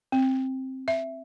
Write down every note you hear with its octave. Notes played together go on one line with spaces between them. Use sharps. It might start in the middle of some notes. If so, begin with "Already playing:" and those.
C4
E5